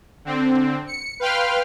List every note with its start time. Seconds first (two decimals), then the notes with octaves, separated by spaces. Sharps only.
0.25 D3 C4
0.87 C#7
1.20 B4 F5 G5 C6 F6